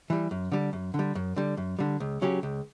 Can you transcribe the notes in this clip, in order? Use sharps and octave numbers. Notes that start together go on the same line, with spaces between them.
E3 G3
F#2
D3 G3
F#2
D3
G3
F#2
D3 G3
F#2
D3 G3
C#2
C#3 F#3 C#4 G4
C#2